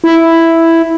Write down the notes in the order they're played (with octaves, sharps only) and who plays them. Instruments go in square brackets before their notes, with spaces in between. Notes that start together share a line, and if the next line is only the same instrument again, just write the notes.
[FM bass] E4